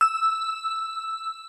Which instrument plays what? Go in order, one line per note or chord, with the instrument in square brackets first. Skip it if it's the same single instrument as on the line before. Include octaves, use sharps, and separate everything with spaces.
[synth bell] E6